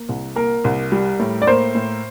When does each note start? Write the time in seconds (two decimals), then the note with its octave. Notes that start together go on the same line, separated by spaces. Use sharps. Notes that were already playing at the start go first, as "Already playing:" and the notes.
Already playing: A#3
0.09 C2
0.36 A#3 A#4
0.64 C2
0.92 G3
1.19 A2
1.42 D5
1.47 A#3 C5
1.75 A2